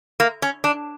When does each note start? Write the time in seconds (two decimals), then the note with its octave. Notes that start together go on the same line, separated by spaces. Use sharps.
0.20 A#3
0.42 C#4
0.64 D4